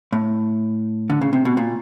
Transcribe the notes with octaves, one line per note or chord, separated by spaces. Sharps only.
A2
D3
C#3
C3
B2
A#2